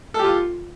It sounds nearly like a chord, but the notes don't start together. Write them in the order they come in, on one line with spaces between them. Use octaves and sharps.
A4 G4 F4